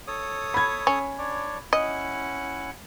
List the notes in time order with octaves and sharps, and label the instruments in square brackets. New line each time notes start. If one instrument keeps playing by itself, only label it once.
[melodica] A4 C#5 D#6
[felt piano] B5 G#6
[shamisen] C#4
[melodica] D4 C#5 D5
[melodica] C#4 E4 F#5 [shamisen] D#5